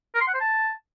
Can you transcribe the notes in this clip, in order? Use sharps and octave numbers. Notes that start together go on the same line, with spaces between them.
A#4
C6
F#5
C5
A5